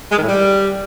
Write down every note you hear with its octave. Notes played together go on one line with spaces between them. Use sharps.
G#3
D#3
A2
G3